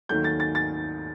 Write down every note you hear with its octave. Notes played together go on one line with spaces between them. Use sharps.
D#2 D#3 F#3 A3 G6
A6
A6
A6